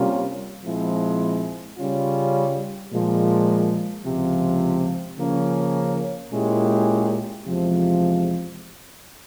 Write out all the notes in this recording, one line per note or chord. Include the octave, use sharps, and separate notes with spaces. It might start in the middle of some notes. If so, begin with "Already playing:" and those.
Already playing: C3 G3 A#3 C#4 F4
A#2 F3 G#3 C4 E4
C#3 G3 C#4 F4
A#2 F3 G#3
C#2 C3 F3
C#3 F3 A#3 C#4
A#2 G#3 C#4 E4 G4
E2 C3 F3 G#3